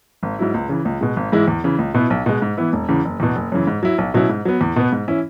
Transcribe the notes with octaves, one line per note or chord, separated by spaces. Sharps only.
G#1
G#2 F#3 E4
C#2
C#3 E3
C#2
B2 G#3
G#1
G#2 E3 G#3 E4
E2
C#3 E3
C#2
B2 B3 E4
B1
B2 G#3
G#2
E3 B3 E4
E1
E2 C#3 E3
F#1
E2 B2
F#1
F#2 C#3 E3
G#2
F#3 E4
B1
B2 F#3 C#4 E4
G#2
F#3 B3
E2
B2 B3
G#2
E3 C#4 E4